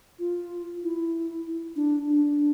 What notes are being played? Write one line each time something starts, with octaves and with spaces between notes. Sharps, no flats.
F4
E4
D4
D4